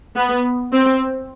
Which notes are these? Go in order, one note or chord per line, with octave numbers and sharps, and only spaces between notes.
B3
C4